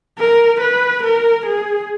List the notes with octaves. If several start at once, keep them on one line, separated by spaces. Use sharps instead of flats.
A#4
B4
A#4
G#4